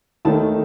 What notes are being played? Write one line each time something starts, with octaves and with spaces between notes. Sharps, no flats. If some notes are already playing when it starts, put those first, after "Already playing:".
D#2 D#3 A3 A5